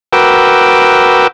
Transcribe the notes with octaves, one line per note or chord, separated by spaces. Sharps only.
F#4 A#4 B4 G5 D6 E6